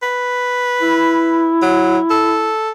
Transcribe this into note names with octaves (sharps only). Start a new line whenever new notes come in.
B4
E4
F#3
A4